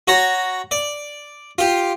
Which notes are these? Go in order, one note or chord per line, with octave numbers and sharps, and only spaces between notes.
F#4 C#5 A#5
D5
F4 G4